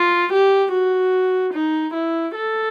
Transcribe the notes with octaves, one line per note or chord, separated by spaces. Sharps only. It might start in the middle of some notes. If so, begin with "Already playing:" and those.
Already playing: F4
G4
F#4
D#4
E4
A4